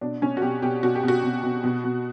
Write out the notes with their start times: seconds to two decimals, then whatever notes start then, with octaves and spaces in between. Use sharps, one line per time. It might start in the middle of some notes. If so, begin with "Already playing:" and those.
0.01 B2 D4
0.22 B2 C#4
0.37 F#4
0.42 B2 G4
0.62 B2 G4
0.82 B2 F#4
0.95 G4
1.03 B2 F#4
1.23 B2
1.43 B2
1.64 B2
1.84 B2